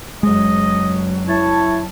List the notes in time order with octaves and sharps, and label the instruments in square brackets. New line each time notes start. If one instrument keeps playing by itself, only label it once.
[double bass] F#1 F#3 [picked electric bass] G#3 [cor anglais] D#5
[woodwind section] E4 A5 [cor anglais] C#5